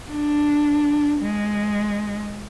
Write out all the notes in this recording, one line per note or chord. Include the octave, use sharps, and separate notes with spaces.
D4
G#3